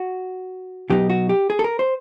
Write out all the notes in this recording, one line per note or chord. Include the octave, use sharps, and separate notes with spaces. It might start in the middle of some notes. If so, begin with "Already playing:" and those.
Already playing: F#4
B2 F#3 B3 D#4 G4
F#4
G4
G#4
A4
A#4
C5